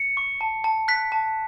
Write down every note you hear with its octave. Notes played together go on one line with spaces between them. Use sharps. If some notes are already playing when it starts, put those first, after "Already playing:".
Already playing: C#7
C#6
A5
A5
F#6 B6
A5